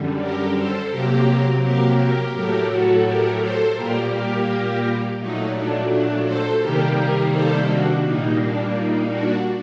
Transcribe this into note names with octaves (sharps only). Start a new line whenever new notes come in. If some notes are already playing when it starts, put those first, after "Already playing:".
Already playing: F#2 D3 G3
G4 A#4
A4 C5
C3 F#3 A#3 G4 A#4
G4 A#4
G4 A#4
A2 F#3 A3 G4 A#4
F#4 A4
G4 A#4
A4 C5
A#2 G3 A#3 G4 A#4
G4 A#4
A#2 F#3 A3 D#4
D4
D4
A4 C5
C3 D#3 G3 A#3 G4 A#4
G4 A#4
A4 C5
D4 F#4
A#2 G3 A#3 D#4
D4
D#4
D4 F#4